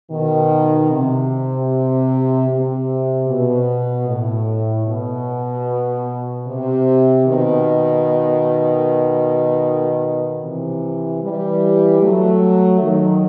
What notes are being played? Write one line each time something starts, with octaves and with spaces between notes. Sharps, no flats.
B2 D#3
C3
C3
B2
A2
B2
C3
B2 D#3
C3 E3
E3 G3
F#3 A3
D#3 F#3